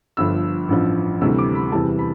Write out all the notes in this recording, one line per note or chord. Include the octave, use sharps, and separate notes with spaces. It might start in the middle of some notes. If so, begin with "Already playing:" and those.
G1 G2 F3 E6
A1 G2 F3
D2 C3 E3 G3 E6
D6
B5
E2 C3 E3 G3 A5
B5